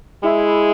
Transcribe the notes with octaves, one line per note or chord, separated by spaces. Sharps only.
G#3 E4